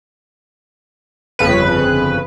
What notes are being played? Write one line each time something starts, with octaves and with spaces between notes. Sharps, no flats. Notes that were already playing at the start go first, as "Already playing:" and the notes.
G1 F2 C#3 B4